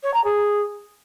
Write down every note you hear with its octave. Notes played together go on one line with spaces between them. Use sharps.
C#5
A#5
G#4